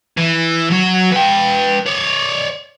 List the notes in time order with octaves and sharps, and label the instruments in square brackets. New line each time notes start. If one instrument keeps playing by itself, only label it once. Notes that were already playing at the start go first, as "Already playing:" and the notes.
[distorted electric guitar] E3
F#3 F#4
B4 G5
C#5 D5